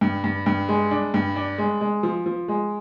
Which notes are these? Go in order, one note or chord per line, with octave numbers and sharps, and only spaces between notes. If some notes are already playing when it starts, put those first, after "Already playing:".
G2
G2
G2
G#3
D4
G2
D4
G#3
G#3
F3
F3
G#3